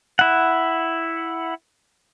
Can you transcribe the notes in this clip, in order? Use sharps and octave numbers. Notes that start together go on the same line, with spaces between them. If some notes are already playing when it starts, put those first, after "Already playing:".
E4 F#5